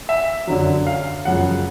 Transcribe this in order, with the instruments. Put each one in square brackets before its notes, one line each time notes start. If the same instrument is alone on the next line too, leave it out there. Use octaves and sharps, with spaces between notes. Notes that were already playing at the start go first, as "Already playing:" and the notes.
[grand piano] E5
F#2 D3 F#3
F5
F#2 C#3 F3 G#3 F#5